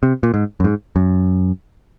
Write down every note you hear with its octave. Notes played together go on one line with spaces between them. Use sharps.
C3
A#2
G#2
F#2
G#2
F#2